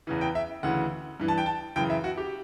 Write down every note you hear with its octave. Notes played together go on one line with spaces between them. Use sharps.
E2 C#3 E3
G5
E5
D2 C#3 E3 F#5
G2 E3
A5
G5
A5
F#2 C#3 E3 G5
E5
F#4
G4